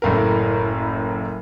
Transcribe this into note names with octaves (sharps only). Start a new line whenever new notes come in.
F#1 A2 A#4